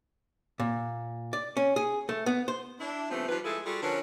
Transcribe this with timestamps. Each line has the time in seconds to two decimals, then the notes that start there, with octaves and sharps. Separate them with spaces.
0.60 A#2
1.33 D5
1.57 C#4
1.76 G#4
2.09 A3
2.26 B3
2.48 C5
2.80 D4 E4
3.10 C#3 F3 G3 A3 B3 C4
3.28 D#3 F3 G3 F4 B4
3.44 F3 G#3 A3 E4 G#4 A4
3.65 G3 F4 F#4 G#4 A4
3.82 D3 F3 C#4 A#4 B4